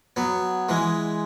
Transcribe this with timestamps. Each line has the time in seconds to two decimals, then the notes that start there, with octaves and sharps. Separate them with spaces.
0.16 F#3 B3
0.69 E3 G#3